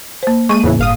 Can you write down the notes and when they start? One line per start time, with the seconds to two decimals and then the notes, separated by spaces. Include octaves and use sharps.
0.23 A#3 C5
0.49 G#3 A#3 C#6 D#7
0.63 E2 A2 C#3 E3
0.79 G1 F5 D#6